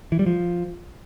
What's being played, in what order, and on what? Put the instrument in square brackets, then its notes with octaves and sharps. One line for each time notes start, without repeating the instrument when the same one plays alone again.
[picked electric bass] E3
G3
F3